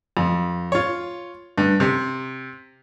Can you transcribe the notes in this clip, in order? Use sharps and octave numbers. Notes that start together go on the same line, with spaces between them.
F2
F4 C#5
G2
C3